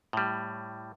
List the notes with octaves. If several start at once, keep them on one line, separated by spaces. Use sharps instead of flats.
A2 G3